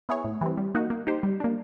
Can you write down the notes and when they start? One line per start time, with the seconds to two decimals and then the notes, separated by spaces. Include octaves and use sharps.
0.09 B3 E4 G#4 C#5
0.24 A2
0.41 E3 G3 C4
0.57 G3
0.75 A#3 D#4 F#4
0.90 A#3
1.07 D#4 G4 C5
1.23 G3
1.40 A#3 D4